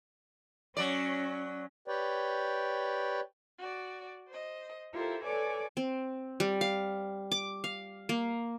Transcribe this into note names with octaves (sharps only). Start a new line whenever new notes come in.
F#3 C#4 D5
G4 B4 C#5 D5 G5
F#4 D5
C5 D#5
E4 F4 G4 A4 A#4 C5
A4 B4 C#5 D5 G#5 D6
C4
G3
F5
D6
F5
A#3